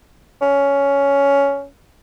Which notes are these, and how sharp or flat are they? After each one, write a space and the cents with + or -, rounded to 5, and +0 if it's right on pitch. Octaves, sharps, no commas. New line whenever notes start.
C#4 +10